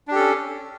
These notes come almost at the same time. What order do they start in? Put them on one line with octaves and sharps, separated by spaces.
D4 G4 A4 C#4